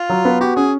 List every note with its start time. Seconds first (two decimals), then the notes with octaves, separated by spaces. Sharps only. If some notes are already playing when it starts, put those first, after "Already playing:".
Already playing: F4
0.09 F#3
0.25 B3
0.41 F#4 G4
0.56 C#4 G#4